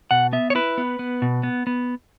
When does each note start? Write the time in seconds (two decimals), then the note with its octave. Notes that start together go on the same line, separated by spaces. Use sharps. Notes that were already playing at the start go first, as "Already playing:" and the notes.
0.11 B2 F#5
0.33 B3 E5
0.50 C#5
0.55 E4 B4
0.78 B3
0.99 B3
1.22 B2
1.43 B3
1.67 B3